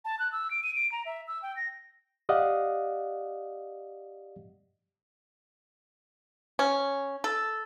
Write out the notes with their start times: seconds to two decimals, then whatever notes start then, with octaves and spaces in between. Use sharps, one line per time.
0.05 A5
0.19 F#6
0.32 E6
0.51 D7
0.63 D#7
0.76 D7
0.92 A#5
1.06 E5
1.28 E6
1.42 G5
1.56 A#6
2.29 G4 D5 D#5 F5 F#5 D#6
6.59 C#4
7.24 A4